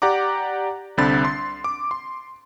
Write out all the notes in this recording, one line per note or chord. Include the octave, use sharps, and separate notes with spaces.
G4 D5 F#5 A#5 D6
C2 D3 C4 B5 A6
C6
D6
C6